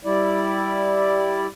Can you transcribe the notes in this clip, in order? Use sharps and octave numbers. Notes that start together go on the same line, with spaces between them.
G3 E4 D5